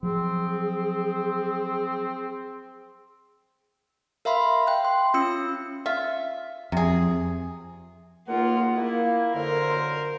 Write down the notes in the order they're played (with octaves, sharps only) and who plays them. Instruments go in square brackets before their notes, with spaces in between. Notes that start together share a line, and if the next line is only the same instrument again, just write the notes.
[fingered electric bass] F3 F#3 [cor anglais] C4 [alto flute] G#4
[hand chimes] A#4 E5 F5 B5 C6
G5 F#6
C6
C#4 F4 E6 C#7
[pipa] F4 E5
[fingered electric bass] F2 [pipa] C3 G#4
[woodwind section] C#2 D#3 F#5 [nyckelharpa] A#3 F4
[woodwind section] A#3 [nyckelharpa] E4
[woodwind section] F#2 D3 [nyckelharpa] A#4 C5